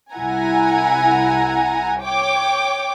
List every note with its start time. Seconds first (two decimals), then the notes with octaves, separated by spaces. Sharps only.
0.14 C2 E4 F#5 G#5 A#5
2.02 C#5 G5 D6